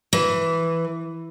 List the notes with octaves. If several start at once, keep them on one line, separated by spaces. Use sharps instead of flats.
E3